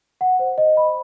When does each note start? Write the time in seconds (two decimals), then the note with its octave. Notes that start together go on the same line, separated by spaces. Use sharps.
0.21 F#5
0.39 C5
0.58 D#5
0.77 B5